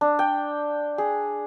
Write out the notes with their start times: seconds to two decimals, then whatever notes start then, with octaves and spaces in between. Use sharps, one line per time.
0.01 D4
0.19 G5
0.98 G#4